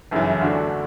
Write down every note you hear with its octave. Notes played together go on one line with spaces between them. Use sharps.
G1 F#2 C#3 E3
D2 D3 A3 D4 F#4